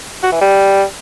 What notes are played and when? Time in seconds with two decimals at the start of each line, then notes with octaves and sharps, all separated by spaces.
0.23 F#4
0.32 E3
0.41 G3